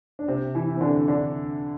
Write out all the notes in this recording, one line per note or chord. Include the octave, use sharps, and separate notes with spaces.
D4
C3 C4
E3 E4
C4
D3 D4
D3 D4